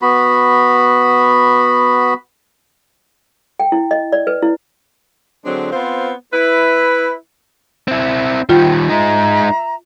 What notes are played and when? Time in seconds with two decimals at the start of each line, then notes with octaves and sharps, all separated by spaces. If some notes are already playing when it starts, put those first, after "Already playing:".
0.02 B3 F#4 B5
3.60 G5
3.72 E4
3.91 D#5
4.12 D5
4.27 B4
4.42 E4
5.45 D3 F#3 G#3 C4 D4
5.72 B3 C4 F4 C5
6.33 E4 B4
7.88 C4 E4
8.49 D#3 G3 F4 C5 F#5 G5
8.89 G#3 D#4 E5 A#5